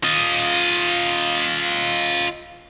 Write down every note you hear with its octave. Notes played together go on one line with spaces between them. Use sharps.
F4 D#5